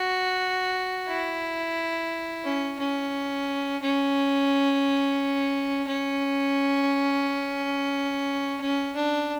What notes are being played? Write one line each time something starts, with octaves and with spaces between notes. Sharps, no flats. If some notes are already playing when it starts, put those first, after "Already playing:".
Already playing: F#4
E4
C#4
C#4
C#4
C#4
C#4
D4